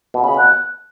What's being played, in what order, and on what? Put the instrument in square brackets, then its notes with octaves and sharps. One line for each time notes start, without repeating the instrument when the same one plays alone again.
[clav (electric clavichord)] B2
[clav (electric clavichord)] C#3 [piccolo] B5
[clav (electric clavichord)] B2 [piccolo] F#6